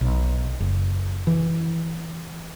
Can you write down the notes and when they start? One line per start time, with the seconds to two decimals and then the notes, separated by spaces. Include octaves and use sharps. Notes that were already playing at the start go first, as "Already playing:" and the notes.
0.01 B1
0.60 F#1
1.27 E3